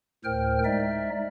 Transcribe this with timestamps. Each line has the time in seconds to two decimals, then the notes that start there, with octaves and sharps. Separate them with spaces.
0.25 D2 A2 A#4 C5 G5 F6
0.65 G#3 D#4 D5 E5